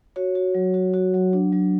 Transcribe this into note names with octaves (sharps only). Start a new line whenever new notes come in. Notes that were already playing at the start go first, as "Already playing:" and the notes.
F#4 C#5
F#4
F#3
F#4
F#4
F#3
D4
F#3